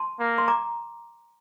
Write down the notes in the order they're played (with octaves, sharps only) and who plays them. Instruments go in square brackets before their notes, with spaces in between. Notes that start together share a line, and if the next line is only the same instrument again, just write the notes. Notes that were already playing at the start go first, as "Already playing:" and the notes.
Already playing: [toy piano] A5 C6
[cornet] A#3
[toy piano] C6
A#5 D6